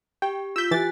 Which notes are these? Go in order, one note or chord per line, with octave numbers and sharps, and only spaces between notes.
G4 G5
F4 E6 G6 B6
E3 G4 G#5 F#6 A6